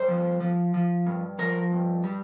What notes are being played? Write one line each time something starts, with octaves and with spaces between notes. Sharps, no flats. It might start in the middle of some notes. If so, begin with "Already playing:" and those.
Already playing: G2 C5
F3
F3
F3
G2
F3 A#4
G2
G3